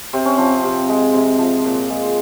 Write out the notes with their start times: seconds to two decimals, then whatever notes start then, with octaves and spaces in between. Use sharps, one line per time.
0.13 C3 C4
0.25 C#4
0.38 F3 C4
0.64 C3
0.89 G#3
1.14 C3
1.39 F3
1.65 A#2
1.90 G#3